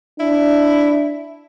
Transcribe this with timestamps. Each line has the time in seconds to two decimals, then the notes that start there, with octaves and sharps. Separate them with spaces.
0.20 D4 E4